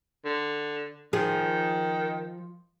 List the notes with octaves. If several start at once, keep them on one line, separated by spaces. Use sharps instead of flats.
D3
D#3 F3 G#4